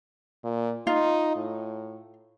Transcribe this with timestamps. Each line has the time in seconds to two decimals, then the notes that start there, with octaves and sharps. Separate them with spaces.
0.44 A#2
0.87 D#4 F4
1.36 A2